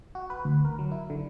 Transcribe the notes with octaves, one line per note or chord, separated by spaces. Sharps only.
F#4
B4
D2
A#4
F#3
E4
D3